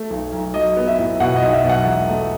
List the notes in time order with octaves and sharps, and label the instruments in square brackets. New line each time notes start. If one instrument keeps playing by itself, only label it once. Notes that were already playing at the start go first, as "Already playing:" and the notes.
Already playing: [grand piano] A3
B1
B1
[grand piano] F#3 [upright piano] D#5
[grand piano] B3
[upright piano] E5
[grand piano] A2
[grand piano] B2 [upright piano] F#5
[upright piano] D#5
[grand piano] B1
[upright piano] E5
[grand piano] B2
[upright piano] F#5
[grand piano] E1
A3